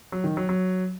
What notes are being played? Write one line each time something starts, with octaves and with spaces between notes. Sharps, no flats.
F#3
D#3
F#3
F#3